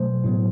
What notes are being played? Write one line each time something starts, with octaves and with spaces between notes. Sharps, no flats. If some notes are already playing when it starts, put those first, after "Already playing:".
Already playing: B2 F#3 A3 C5
A2 F#3 B3